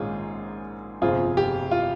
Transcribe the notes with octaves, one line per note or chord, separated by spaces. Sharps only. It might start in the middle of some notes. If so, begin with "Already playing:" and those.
Already playing: A#1 G#2 D#3 A#3 C#4 F4 G#4
G1 F2 C3 F3 C4 F4 G#4
G4
F4